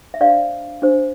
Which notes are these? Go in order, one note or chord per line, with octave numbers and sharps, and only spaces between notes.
E5
D4 G4 C5 D5 F5
D4 G4 C5